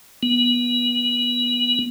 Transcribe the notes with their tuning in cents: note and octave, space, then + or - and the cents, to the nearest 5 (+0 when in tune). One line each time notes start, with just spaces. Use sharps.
B3 -25